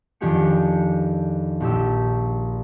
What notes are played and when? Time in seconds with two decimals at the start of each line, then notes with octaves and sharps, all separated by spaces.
0.21 F2 D#3 D4 G4 G#4 C#7
1.60 A#1 G4 E6